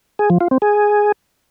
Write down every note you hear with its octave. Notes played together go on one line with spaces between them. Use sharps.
G#4
F3
F4
C4
G#4